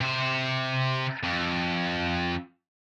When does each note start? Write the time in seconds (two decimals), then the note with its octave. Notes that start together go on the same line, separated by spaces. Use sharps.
0.01 C3 C5
1.24 F2